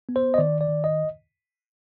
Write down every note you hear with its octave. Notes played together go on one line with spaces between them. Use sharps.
B3
C5
D#5
D#3 D5
D5
D#3
D#5